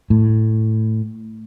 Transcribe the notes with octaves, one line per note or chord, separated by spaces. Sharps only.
A2